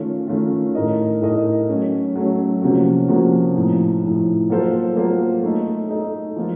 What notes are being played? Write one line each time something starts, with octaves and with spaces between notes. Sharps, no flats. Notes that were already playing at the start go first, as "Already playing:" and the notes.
Already playing: D#3 A3 C#4 F4
D#3 A3 C#4 F4
A2 A3 D#4 A#4 D#5
A2 A3 D#4 A#4 D#5
F#3 A3 C#4
F#3 A3 C#4
C3 F3 A#3 C#4 F#4
C3 F3 A#3 C#4 F#4
A2 F3 A3 D#4
A2 F3 A3 D#4
F#3 A#3 F4 A4 C5
F#3 A#3 F4 A4 C5
A3 D#4 A4 D#5
A3 D#4 A4 D#5
F3 A#3 F4